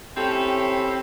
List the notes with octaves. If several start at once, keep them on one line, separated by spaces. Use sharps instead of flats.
C4 C#4 E4 G4 A4